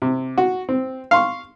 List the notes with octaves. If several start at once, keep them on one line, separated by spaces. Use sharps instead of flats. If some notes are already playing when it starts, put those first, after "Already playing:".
C3
F#4
C4
F5 C6 C#6